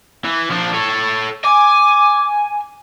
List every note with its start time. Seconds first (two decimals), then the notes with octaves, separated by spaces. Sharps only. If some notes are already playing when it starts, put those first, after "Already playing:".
0.24 E3
0.51 F3 D4
0.74 A4 C#5
1.44 G#5 D6